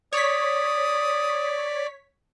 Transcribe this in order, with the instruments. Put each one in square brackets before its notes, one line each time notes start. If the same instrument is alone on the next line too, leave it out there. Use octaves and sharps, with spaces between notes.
[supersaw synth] C#5 B6 [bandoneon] D5 [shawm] D#6